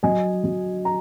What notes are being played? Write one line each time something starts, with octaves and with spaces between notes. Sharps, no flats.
F#3 D#5 G#5
F#3
A#5